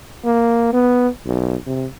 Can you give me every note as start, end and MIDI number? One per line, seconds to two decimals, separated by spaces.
0.25 0.71 58
0.73 1.08 59
1.25 1.56 35
1.67 1.86 48